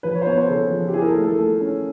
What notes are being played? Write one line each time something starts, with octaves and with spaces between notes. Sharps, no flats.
F3 B4
C#5
C5
B3 C#5
C5
C#3 A4
F3
G4
E4 G#4
A#4
A4
A3
A4
A3 A4
C#4